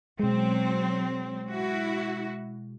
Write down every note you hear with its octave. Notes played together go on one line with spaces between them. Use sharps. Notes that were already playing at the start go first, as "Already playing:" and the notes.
B2 F#3 G#3 C4
E4 F#4